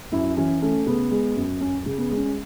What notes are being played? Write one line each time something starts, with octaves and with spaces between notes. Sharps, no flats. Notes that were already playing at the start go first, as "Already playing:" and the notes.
F#2 E4
E3 C#4
A3 C#4
C#3 B3
G#3
F#2
F#2 C#4
C#3
B3
G#3
C#4